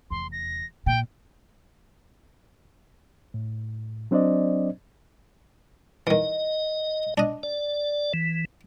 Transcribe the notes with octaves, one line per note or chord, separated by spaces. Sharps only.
F1 E2 C6
A#6
A#2 G5
A2
F#3 C4 D4 C5 D5 D#5
D#3 E3 D#5
D4 D#5
D5
E3